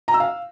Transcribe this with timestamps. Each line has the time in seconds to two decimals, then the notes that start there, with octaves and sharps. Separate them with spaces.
0.08 A#5
0.14 E6
0.20 F5